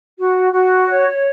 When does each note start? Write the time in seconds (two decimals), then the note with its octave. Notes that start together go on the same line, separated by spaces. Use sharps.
0.18 F#4
0.53 F#4
0.87 C#5